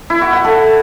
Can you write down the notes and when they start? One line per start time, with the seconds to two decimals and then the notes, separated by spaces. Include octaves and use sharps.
0.10 E4
0.21 F#4
0.33 F#5
0.44 A4